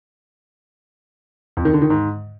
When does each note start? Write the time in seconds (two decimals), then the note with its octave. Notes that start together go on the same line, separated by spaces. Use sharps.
1.57 F2
1.65 D#3
1.73 D3
1.82 D#3
1.90 G#2